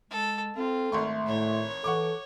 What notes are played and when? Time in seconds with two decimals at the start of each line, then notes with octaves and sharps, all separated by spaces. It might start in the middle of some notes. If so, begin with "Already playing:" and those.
0.11 G#3 A4
0.56 C4 F4 A4
0.92 G#1 A3 C6 C#6
1.27 A2 C#5
1.84 E3 A4 F#5 C#6 D6